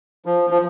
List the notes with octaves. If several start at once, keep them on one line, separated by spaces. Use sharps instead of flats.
F3
F3